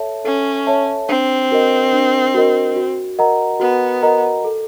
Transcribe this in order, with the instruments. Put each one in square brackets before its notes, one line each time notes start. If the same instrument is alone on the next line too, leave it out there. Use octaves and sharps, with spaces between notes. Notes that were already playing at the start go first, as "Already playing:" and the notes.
Already playing: [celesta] A4 C#5 E5 A5
[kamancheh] C#4 [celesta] A4
[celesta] C#5 E5 A5
[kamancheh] C4 [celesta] D4
[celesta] F#4 A#4 D#5
D4
F#4 A#4 D#5
F#4
A#4 D#5 F#5 A#5
[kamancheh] B3 [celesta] F#4
[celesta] A#4 D#5 F#5 A#5
A4